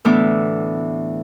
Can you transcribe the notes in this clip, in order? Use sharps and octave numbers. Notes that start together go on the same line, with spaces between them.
D2 A2 E3 B3 D4 D6